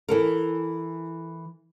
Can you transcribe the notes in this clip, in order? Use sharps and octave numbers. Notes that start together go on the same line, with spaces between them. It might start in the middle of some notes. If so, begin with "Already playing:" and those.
E3 A4 A#4